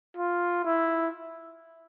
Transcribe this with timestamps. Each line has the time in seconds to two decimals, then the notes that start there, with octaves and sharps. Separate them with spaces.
0.17 F4
0.65 E4